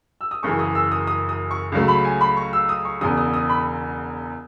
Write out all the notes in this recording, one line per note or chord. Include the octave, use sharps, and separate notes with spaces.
E6
D#6
F#1 F#2 C#3 E3 C#6
D#6
E6
D#6
D#6
D#6
C#6
C#2 C#3 F#3 A3
B5
G#5
B5
C#6
E6
D#6
C#6
E1 E2 C#3 D#6
D#6
D#6
B5